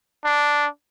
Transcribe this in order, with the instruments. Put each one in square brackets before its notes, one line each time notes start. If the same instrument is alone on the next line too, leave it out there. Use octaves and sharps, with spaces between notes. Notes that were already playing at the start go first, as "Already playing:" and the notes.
[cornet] D4